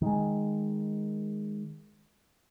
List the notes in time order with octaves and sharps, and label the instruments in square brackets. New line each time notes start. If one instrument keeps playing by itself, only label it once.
[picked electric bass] D#3 G#3